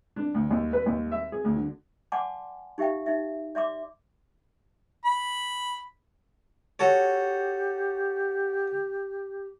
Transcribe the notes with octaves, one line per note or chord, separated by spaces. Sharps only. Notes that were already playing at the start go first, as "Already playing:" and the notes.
D4
D2
D#2
B4
D#2
E5
G#4
D2
D3
D5 F#5 G#5 A5 C6 D6
D#4 G4 E5 F5 G5
D#4 E5
D5 E5 C6 D6
B5
F#4 G4 A4 C#5